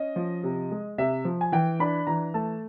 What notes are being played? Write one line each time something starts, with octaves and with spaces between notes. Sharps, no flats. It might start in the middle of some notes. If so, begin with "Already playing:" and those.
Already playing: C#4 D#5
F3
C3
G#3
C3 E5
F3
G#5
E3 G5
D4 B5
E3 A#5
A3 A5